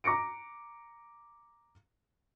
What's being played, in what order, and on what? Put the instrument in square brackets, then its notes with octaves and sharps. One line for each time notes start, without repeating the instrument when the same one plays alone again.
[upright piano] A#5 D6 A#6 C#7 D7